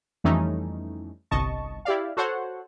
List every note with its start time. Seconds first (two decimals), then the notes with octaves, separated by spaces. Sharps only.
0.24 F2 E3 G3 A3 C#4 D#4
1.31 G1 C2 D#5 A5 C#6
1.85 E4 G4 D5 F5
2.17 F#4 A4 C5 C#5 F#5